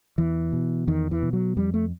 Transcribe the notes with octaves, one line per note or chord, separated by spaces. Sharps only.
E2 E3
B2
E2 D#3
E3
B2
F#3
F2 G3
A3